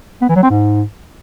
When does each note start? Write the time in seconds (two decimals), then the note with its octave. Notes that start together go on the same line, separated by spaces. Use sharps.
0.22 B3
0.29 E3
0.36 F#3
0.43 C4
0.50 G#2